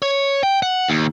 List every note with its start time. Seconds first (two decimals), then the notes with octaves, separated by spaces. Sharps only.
0.02 C#5
0.43 G5
0.62 F#5
0.89 D#2